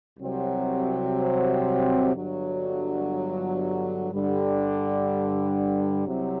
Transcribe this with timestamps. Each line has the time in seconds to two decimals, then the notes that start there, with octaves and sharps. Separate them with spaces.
0.19 C2 C3 F#3 C4
2.15 G1 G2 D3 F#3
4.11 G2 D3 G3
6.07 C2 C3 F#3